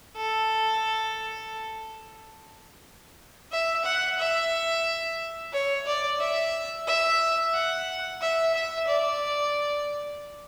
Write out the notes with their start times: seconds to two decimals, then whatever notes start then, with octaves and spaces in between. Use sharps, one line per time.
0.16 A4
3.52 E5
3.85 F#5
4.19 E5
5.53 C#5
5.86 D5
6.20 E5
6.87 E5
7.54 F#5
8.21 E5
8.54 E5
8.88 D5